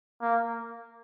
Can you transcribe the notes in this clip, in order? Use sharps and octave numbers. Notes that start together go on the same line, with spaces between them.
A#3